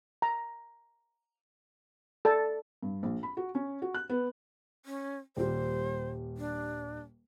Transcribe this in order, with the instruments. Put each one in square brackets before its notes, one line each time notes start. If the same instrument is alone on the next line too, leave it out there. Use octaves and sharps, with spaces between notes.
[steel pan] A#5
A4 D5 A5
[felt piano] G2
A#1
B5
F#4
C#4
F#4
F#6
B3
[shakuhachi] C#4
[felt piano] D#1 G3 [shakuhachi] C5
[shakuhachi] D4